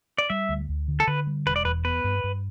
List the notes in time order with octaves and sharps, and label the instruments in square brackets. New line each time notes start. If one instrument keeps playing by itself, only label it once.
[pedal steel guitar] D5
[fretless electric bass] G3 [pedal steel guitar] E5
[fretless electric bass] D2
D2
D3
[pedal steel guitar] A4
[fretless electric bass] D3 [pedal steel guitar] B4
[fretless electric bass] G3
[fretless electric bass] E1 [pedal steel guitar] B4
[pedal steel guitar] D5
[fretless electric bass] E2 [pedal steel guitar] B4
[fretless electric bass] B3 [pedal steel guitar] B4
[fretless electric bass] G2
G2